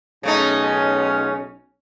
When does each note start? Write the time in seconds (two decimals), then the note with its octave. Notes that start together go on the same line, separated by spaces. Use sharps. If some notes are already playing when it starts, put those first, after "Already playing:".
0.23 B1 C#3 A3 C#4 D#4